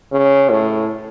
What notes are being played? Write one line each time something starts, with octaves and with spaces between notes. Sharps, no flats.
C#3
A2